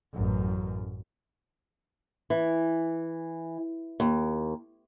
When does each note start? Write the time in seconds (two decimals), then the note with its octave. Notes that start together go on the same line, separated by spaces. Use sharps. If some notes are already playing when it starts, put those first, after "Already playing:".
0.16 A1 F#2
2.30 E3
4.00 D#2